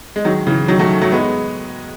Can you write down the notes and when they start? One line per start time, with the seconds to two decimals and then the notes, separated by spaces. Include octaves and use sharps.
0.16 G#3
0.25 D#3 F#3
0.47 C#3 E3
0.68 D#3 F#3
0.79 F#3 A3
1.01 F#3 A3
1.12 G#3 B3